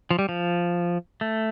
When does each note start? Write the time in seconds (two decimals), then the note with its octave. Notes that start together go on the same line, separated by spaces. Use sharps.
0.11 F3
0.19 G3
0.29 F3
1.21 A3